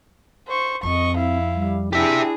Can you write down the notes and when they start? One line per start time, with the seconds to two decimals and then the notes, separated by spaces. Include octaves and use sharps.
0.47 C5 C#6
0.83 F2 C4 D#5 C#6
1.17 E4 F5
1.55 G3
1.93 D4 E4 G4 G#4 E5